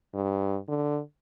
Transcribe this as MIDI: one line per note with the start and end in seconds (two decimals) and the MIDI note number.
0.14 0.58 43
0.69 1.00 50